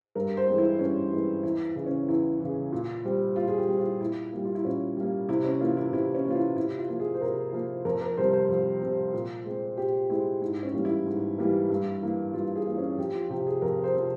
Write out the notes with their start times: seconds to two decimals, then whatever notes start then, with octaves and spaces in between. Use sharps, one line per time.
0.15 G2 A#4
0.37 C5
0.48 E3 G#3 C4
0.58 E4
0.79 G2 C#4
1.12 E3 G#3 C4
1.43 E2 E4
1.65 E4
1.76 C#3 E3
1.86 C#4
2.08 E2 E4
2.40 C#3 E3
2.72 A#2
3.04 G3 C4
3.36 A#2 F4
3.48 G#4
3.57 G4
3.68 G3 C4
3.79 F4
4.00 A#2 E4
4.32 G3 A#3
4.45 F4
4.55 E4
4.64 A#2 C#4
4.97 G3 A#3
5.28 C3 E4
5.45 C#4
5.61 E3 A#3 F4
5.77 E4
5.92 C3 E4
6.14 C#4
6.24 E3 A#3
6.31 F4
6.35 E4
6.56 C3 E4
6.78 F4
6.89 F3 A#3
7.00 G#4
7.15 C5
7.21 C3 A#4
7.52 F3 A#3
7.85 F2 A#4
8.02 A#4
8.17 C3 G3 C4 C5
8.33 C5
8.49 F2
8.81 C3 G3 C4
9.13 A#2
9.45 G#3 C4
9.77 A#2 G4
10.10 G#3 C4 E4
10.41 G#2 E4
10.63 C#4
10.74 E3 G3 A#3
10.85 E4
11.06 G#2
11.38 E3 G3 A#3
11.70 G2
12.02 E3 A#3
12.34 G2 F4
12.55 G#4
12.67 E3 A#3
12.77 C#4
12.98 F2 G4
13.15 F4
13.30 C3 F3 G4
13.47 G#4
13.62 F2 A#4
13.84 C5
13.94 C3 F3